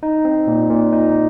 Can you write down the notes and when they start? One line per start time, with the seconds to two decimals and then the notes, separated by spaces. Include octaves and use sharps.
0.03 D#4
0.25 C4
0.47 A#2
0.70 A#2
0.93 D#4